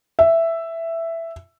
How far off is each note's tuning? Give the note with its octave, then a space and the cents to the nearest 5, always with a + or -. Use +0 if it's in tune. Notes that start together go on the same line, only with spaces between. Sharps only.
E5 +5